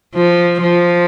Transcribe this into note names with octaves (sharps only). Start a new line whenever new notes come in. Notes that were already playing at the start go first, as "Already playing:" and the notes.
F3
F3